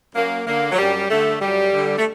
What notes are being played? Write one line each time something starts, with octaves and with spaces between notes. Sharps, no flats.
F#2 A#3
D3 A#3
F#3
F#2 G3
D3 A3
F#2 G3
D3
A3